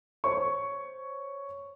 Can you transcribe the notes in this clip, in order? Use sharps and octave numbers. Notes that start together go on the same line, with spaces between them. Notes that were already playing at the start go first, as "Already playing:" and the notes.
C5 C#5 C#6